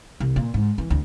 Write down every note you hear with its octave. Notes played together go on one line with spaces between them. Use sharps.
C2
A#2
G#2
E3
D2